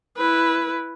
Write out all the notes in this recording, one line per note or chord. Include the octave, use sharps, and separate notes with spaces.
E4 B4